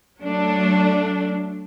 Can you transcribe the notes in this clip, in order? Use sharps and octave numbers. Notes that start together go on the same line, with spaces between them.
F#3 A3 D4